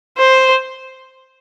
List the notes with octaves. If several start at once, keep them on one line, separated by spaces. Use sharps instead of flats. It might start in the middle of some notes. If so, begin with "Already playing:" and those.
C5